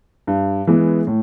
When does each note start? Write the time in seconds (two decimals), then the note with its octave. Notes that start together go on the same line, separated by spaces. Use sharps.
0.27 G2
0.67 E3 G#3 B3
1.07 A2